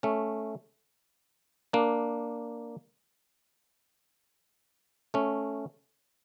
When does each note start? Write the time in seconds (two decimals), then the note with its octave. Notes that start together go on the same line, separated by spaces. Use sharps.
0.03 A3 C#4
1.73 A#3 D4
5.14 A3 C#4